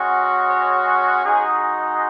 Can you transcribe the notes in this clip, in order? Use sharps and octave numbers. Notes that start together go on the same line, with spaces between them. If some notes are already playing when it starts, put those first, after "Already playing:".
Already playing: G#3 C#4 F#4
C#5
G#3 D#4 F#4 G#4